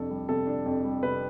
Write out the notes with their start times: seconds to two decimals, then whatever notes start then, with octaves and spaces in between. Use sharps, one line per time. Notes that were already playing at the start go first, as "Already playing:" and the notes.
Already playing: F2 C3 D4 A4
0.10 G3
0.29 C3 A4
0.47 D4
0.66 F2
0.84 G3
1.03 C3 B4